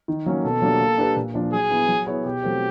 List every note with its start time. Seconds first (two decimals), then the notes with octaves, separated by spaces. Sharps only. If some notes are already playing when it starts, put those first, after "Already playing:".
0.08 D#3
0.26 F#3 A#3 C#4
0.45 B2 A4
0.62 F#3 A#3 D4 G4
0.81 A#3
0.98 D4 G4 B4
1.16 A#2
1.34 F3 A#3 D4 F4
1.53 F#3 G#4
1.71 B3 E4
1.88 F#3
2.06 B3 E4 G#4 C#5
2.25 B2 G4
2.44 F#3 A3 C4